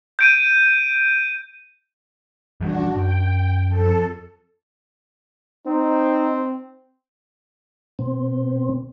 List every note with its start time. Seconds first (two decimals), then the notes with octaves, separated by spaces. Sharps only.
0.19 G6 D7 D#7
2.61 F2 E3 G3 D4 F#4
2.96 F#2 G5
3.67 F2 A4
5.67 C4 D#4
7.99 B2 C4